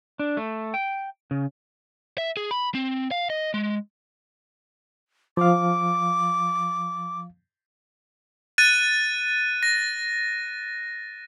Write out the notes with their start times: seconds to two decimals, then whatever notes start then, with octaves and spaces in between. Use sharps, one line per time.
0.19 D4
0.37 A3
0.74 G5
1.31 C#3
2.18 E5
2.37 G#4
2.51 B5
2.75 C4
3.11 F5
3.30 D#5
3.54 G#3
5.37 F3 F5 D6
8.58 F#6 A6 D#7
9.63 A#6